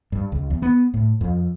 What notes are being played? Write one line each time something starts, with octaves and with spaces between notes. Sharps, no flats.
G2
C#2
E2
B3
A2
F2